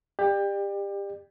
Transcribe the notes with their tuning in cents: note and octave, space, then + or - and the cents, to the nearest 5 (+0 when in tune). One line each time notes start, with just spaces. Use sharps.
G4 +25 D5 +35